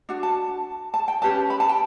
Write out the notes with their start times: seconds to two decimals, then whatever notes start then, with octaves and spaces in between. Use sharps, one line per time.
0.09 D4 F#4
0.23 A5
0.94 A5
1.08 G5
1.22 C#4 G4 B4 A5
1.50 B5
1.60 A5
1.69 G5